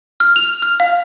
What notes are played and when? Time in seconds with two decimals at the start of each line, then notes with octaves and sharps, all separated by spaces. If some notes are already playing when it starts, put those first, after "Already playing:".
0.20 F6
0.36 F7
0.62 F6
0.80 F5